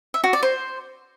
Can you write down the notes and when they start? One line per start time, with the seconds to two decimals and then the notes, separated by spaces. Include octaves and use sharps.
0.14 E5
0.24 F#4
0.33 D5
0.43 C5